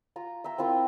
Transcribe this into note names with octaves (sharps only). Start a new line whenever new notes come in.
F4 A#5
E5 G5 A#5
C4 E4 F4 A#4